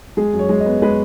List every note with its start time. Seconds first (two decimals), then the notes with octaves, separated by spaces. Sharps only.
0.17 G#3 G#4
0.33 F#2
0.39 C#5
0.49 G#3
0.60 D#5
0.66 B3
0.82 G#3 B4